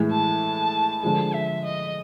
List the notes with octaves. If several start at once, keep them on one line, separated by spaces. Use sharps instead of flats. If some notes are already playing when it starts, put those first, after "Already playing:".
Already playing: A2 E3 G#3
A5
D3 F3 G#3 A5
E5
D#5